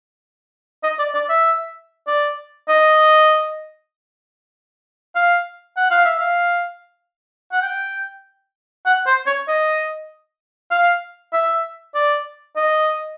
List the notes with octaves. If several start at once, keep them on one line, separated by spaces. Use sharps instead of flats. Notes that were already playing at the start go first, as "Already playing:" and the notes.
D#5
D5
D5
E5
D5
D#5
F5
F#5
F5
E5
F5
F#5
G5
F#5
C5
C#5
D#5
F5
E5
D5
D#5